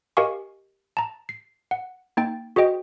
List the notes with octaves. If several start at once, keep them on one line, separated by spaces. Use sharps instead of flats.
G4 A#4 D#5 F5 G#5 C#6
A5 A#5
C7
F#5
A#3 D#4 G5 A6
F#4 G#4 C5 D#5 G5